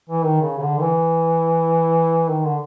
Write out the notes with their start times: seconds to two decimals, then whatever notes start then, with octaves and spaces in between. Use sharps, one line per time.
0.10 E3
0.26 D#3
0.42 C#3
0.58 C#3
0.63 D3
0.78 D#3
0.82 E3
2.29 D#3
2.45 D3